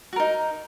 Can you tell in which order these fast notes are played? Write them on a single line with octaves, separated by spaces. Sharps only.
F#4 A#4 D#4